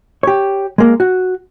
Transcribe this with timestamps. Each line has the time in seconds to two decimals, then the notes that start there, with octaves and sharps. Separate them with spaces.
0.23 G4 C#5
0.78 G#3 A#3
1.00 F#4